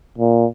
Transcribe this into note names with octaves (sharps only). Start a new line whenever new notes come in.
A#2